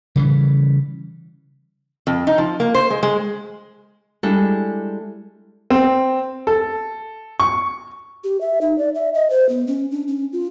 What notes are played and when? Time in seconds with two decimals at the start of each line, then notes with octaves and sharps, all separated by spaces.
0.16 C#3 E3 G3
2.07 F2
2.27 D#4
2.38 F3
2.60 A#3
2.75 C5
2.90 G#3
3.03 G#3
4.23 G3 G#3 D4 E4 A4
5.70 C4
6.47 A4
7.40 C#6
8.24 G4
8.41 E5
8.61 D#4
8.78 D5
8.95 E5
9.14 D#5
9.30 C5
9.49 B3
9.67 C#4
9.91 D4
10.08 C#4
10.33 F4